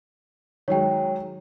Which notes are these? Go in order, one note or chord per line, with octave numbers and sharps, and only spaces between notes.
D#3 F#3 G#3 C#5 G5